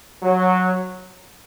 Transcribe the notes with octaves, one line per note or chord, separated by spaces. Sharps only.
F#3